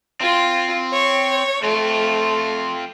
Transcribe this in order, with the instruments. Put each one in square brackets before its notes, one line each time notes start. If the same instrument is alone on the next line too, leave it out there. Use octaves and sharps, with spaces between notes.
[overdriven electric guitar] C4 [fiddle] F4
[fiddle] C#5
[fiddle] A3 [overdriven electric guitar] C4 F4